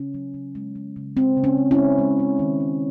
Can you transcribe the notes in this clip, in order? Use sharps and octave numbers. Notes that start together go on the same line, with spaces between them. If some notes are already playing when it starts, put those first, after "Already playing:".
Already playing: C#3 C#4
F#3
C#3
G#3
G#3
C#3
G#3 C4
C#3
C#4
G#3
C#4 E4
G#3
G#3
G#3
D#3
G#3